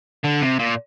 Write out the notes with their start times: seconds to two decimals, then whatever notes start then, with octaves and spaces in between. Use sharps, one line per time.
0.24 D3
0.41 C3
0.59 A#2